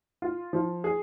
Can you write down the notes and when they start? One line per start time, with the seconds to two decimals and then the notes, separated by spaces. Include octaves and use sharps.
0.22 F4
0.53 F3
0.84 G#4